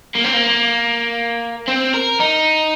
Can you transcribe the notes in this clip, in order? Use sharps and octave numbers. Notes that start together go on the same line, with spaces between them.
A#3
C4
A#3
C4
A#4
D#4